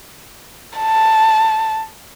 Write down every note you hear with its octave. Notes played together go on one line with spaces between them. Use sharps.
A5